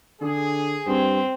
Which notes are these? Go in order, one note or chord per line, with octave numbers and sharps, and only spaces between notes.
D3 G#4
G2 C4